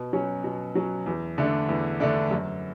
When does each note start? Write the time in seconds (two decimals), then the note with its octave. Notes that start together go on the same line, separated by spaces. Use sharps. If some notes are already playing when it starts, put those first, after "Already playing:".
Already playing: B2
0.13 F#3 C#4
0.44 B2
0.75 F#3 C#4
1.06 E2
1.38 D3 A3 D4
1.69 E2
2.00 D3 A3 D4
2.31 F#2